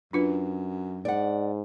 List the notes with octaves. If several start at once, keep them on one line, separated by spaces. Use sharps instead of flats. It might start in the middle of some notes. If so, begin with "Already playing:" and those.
F#2 D4 F4 B4
G#2 D5 F#5